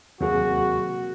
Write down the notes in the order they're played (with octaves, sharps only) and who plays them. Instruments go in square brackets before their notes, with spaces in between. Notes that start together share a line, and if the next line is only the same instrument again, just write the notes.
[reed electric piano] D#2 G#4 [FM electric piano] C3 F#3 A#3 [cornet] F#4